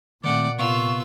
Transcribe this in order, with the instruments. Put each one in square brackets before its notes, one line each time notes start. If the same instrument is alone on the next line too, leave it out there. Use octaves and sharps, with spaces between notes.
[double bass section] A#2 [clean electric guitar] D#3 A3 C4 [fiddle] D5 F#5 [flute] D6
[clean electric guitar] C3 B3 F5 [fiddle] F4 E6 [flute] C#6